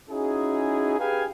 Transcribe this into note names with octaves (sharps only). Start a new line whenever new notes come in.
C#4 D#4 E4 F#4 G#4
G4 G#4 B4 F5 G5 G#5